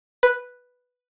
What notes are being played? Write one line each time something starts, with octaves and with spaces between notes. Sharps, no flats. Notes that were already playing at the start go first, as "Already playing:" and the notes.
B4